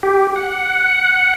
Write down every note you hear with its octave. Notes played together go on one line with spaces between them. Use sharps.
G4
F#5